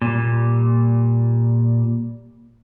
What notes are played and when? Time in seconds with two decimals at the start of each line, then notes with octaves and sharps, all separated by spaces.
0.02 A#2 G3